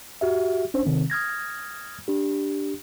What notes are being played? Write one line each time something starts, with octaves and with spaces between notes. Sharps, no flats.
F#4 G4 E5
C#4 D4 C5
C3 D#3 C4
D#6 F6 G#6 A#6
D4 G4